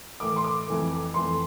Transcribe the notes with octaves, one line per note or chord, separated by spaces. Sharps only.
A2 E3 A3 D6
C6
D6
F2 E3 A3
F2 E3 A3 C6